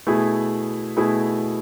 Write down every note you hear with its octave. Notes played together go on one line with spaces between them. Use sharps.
B2 A3 E4 G#4
B2 A3 E4 G#4